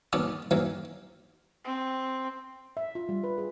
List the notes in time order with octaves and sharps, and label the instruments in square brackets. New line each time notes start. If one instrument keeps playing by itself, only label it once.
[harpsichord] B2 D#3 A#3 C#4 D5 A5
D#3 E3 F#3 A#3 C#4
[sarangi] C4
[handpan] E5
F4
G3
B4
G#4